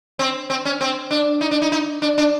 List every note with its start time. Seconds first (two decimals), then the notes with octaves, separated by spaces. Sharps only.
0.19 C4
0.50 C4
0.65 C#4
0.81 C4
1.11 D4
1.41 D#4
1.51 D4
1.62 D#4
1.72 D#4
2.02 D4
2.18 D4